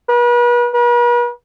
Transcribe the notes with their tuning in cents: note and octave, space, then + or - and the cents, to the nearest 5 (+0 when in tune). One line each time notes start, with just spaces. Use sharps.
B4 -40
B4 -45